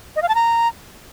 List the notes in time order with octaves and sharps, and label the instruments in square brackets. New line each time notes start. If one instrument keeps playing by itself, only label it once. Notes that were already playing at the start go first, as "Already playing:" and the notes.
[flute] D#5
F5
A5
A#5